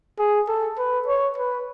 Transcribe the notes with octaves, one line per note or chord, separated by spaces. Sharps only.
G#4
A4
B4
C#5
B4